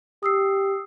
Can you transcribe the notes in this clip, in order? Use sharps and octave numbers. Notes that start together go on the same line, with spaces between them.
G4 D#6 E6 C7